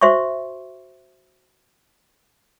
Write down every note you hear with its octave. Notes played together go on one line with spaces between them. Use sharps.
F#4 C5 E5 C6 C#6